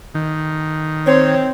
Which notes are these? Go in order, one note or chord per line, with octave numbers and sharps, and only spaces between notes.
D#3
C4 C#5